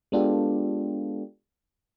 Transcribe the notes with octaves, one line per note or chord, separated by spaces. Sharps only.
G#3 B3 D4 F4 G4 A4